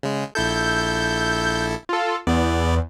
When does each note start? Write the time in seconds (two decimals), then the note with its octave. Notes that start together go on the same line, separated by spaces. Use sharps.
0.03 C#3 G#3
0.35 A#1 E4 A4 G6
1.89 F4 A4
2.27 E2 B3 D5